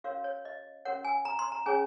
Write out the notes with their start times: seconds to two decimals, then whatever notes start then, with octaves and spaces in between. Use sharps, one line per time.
0.04 C#4 F#4 A#4 C#5 F5
0.24 C#5
0.45 D#5
0.85 C#4 F#4 A#4 C#5 F#5
1.05 G#5
1.25 A#5
1.39 C6
1.52 A#5
1.66 C#4 G#4 C#5 G#5